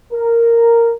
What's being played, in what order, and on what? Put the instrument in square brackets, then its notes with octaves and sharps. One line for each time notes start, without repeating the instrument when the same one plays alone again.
[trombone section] A#4